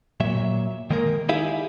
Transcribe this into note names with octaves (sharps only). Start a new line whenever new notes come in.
A#2 F#3 E5
D#3 G#3 A#3 A#4
D#4 E4 G4 G#4 E5 F5